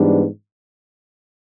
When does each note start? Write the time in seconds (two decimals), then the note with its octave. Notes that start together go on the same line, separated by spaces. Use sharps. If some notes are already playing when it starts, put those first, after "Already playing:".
Already playing: G#2 E3 G3 B3 D4